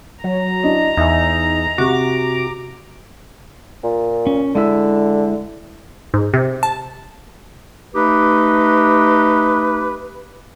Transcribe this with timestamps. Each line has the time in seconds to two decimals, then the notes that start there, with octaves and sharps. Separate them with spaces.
0.24 F#3 A#5
0.63 D4 E4 D#5
0.97 E2 D#4 E5 G#5
1.78 C3 F#4 G4 D6
3.84 A#2
4.27 C#4
4.55 D3 G#3 E4 E5
6.14 G#2
6.34 C3
6.63 A5
7.94 A3 D#4 G4 B4